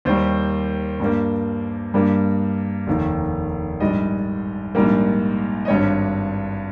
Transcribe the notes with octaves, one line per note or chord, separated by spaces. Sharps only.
D#2 D#3 G3 C5
G2 G3 A#3
G2 G3 A#3
F1 D#2 D#3
A#1 G#2 G3 D#5
A#1 G#2 G3 A#3
D#5
G#1 G2 G3 C#5